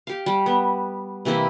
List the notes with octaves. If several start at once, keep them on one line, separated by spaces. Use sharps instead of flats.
G4 F5
G3
B3
C3 E3 A#3 E4